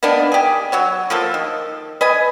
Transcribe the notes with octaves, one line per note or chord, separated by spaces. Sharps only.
D#3 A#3 B3 D4
G4 G#4
F#3 F#4 C#5
F3 A#3 A4
D#3
B4 D#5 G#5